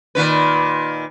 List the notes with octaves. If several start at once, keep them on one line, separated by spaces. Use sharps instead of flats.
A#2 D#3 B4